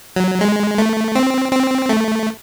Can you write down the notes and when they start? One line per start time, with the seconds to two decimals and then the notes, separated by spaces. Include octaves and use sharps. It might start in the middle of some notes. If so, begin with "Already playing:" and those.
0.16 F#3
0.41 G#3
0.78 A3
1.15 C4
1.52 C4
1.89 A3